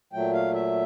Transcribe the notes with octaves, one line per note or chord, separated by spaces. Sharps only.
A#2 F#3 A3 G5
F5
E5